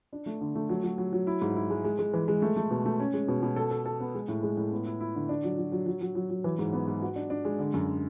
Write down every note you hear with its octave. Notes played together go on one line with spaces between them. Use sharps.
D4
A3
D3
A3
F#3
F#3
F#3
F#3
E4
G#2
E4
G#3
G#3
G#3
E3
G#3
A3
A3
B2
A3
C#4
G#3
B2
B2
A4
A4
A4
B3
G#3
A2
G#3
A2
B3
E4
E4
D3
D4
F#3
F#3
F#3
F#3
F#3
F#3
F#3
E3
G#2
B3
G#2
F#4
D4
D4
G#3
D3
F#2